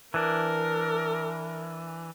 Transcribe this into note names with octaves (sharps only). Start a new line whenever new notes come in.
E3 D4 A#4